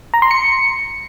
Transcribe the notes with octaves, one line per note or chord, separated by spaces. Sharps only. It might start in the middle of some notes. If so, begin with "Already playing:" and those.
A#5
C6
C#7